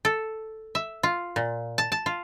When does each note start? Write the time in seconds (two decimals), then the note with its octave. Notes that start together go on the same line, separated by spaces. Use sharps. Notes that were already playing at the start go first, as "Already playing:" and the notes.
0.05 A4
0.75 E5
1.03 F4
1.36 A#2
1.78 A5
1.92 A5
2.06 F4